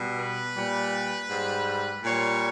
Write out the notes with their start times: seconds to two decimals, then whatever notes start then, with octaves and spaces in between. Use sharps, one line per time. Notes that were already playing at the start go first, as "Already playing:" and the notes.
Already playing: B2 G3
0.19 B4
0.56 A#2 G3
1.30 G#2 G3
2.04 A#2 G3 C#5